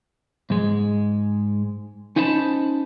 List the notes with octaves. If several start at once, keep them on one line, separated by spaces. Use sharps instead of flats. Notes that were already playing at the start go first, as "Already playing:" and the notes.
G#2 G#3
C#4 D#4 E4 C5 A5 B5